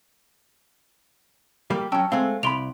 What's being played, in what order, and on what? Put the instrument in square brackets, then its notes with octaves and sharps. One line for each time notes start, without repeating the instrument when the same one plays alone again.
[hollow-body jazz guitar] G3 A#3 G4
[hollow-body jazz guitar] F#3 C#4 [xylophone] G5 A5 E6
[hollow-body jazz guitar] G#3 A3 C4 [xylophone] F5
[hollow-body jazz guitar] C2 B5 [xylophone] C6 D7 F7